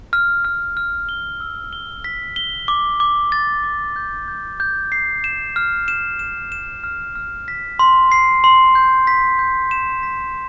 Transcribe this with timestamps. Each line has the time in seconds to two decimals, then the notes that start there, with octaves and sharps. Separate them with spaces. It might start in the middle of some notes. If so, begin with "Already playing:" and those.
0.13 F6
0.45 F6
0.77 F6
1.09 G7
1.40 E6
1.73 G7
2.04 B6
2.36 G7
2.68 D6
3.00 D6
3.32 A6
3.64 D6
3.96 G6
4.28 G6
4.60 G6
4.92 C7
5.24 E7
5.56 F6
5.88 E7
6.19 E7
6.52 E7
6.84 F6
7.15 F6
7.48 B6
7.79 C6
8.12 C7
8.44 C6
8.75 G6
9.07 B6
9.39 G6
9.71 E7
10.03 B6